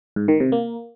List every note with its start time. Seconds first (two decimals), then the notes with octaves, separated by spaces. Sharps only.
0.16 G#2
0.28 D#3
0.40 C3
0.52 A#3